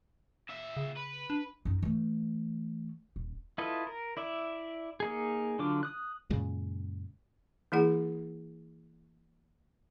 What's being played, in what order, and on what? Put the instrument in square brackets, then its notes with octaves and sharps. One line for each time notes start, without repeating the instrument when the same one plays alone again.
[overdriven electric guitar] A#2 E5
[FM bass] C#3
[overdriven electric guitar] B4
[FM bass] D4
[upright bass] F#2 D#4
E3 A3
D#1
[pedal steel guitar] E4 F4 A4 B4 D#5
A#4
E4 D5 E5
A#3 D#4 G#4
D3 F#3 D4 F4 D6
D#6 F#6
[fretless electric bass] F#2 A#2 C#3 G#3
[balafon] E3 A#3 E4 G#4 F#5